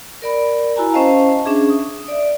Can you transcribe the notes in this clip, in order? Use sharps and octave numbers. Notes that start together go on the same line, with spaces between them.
A#4 D5 B5
E4 F#4 G#5 A#5
C#4 C5 D#5 F5 A5
C#4 D4 G#4 E5
D#6
D5 E5